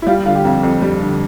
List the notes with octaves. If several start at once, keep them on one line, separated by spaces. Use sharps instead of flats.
E4
G3 F4
D3 F4
G4
F2 F4
F2
G3
D3